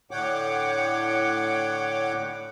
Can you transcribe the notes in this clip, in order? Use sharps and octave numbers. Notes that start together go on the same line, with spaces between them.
A2 D3 C#5 F#5 G5 D6